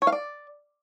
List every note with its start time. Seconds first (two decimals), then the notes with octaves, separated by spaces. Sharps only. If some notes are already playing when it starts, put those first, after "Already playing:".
0.02 C#5
0.07 F5
0.12 D5